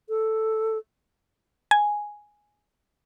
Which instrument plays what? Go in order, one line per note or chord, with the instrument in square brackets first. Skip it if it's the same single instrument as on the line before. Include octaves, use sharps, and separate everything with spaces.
[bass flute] A4
[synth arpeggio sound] G#5